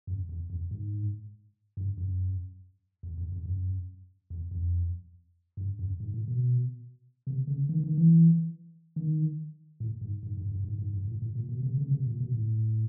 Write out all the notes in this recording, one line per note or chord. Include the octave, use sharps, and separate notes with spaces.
F#2
E2
F2
G#2
G2
F#2
E2
F2
F2
F#2
E2
F2
G2
F#2
G#2
A2
B2
C3
C#3
D#3
D#3
E3
D#3
A2
G#2
G#2
G2
G2
G#2
G#2
G2
A2
A2
A#2
B2
C3
C#3
C3
A#2
B2
A2